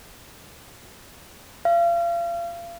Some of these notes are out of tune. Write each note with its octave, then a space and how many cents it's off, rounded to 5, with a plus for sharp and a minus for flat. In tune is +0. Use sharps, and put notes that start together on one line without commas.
F5 -35